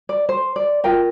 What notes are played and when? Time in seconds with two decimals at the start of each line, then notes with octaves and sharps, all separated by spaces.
0.09 D5
0.29 C5
0.56 D5
0.84 F4 A#4 G5